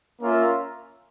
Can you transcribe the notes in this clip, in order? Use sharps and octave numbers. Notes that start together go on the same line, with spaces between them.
A#3 C#4 F4 A#4 E5